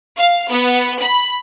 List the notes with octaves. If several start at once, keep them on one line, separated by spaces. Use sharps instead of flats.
F5
B3
B5